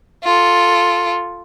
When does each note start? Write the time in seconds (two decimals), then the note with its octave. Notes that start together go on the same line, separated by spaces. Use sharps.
0.24 F4 A4